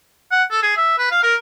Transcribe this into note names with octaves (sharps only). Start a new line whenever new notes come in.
F#5
A4
G#4
E5
B4
F5
A#4